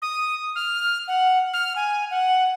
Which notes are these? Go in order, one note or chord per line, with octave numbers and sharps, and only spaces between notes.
D#6
F6
F#5
F6
G#5
F#5